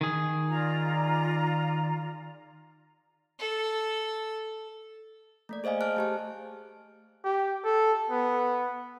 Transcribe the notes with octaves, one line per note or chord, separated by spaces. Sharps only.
D#3 G#4
F4 D5 A#5
A4
A3 A#3 D5
G#4 C5 D#5 F5 G#5
G#4 C5 A5 F6 F#6 D7
A3 G4 A5
G4
A4
B3